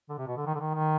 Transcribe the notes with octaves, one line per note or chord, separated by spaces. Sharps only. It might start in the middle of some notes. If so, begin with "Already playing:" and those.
D3
C3
B2
D3
D#3
D3
D#3
D#3